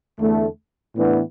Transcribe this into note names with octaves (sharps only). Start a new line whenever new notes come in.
E2 D3 A3
A2 E3 B3 D4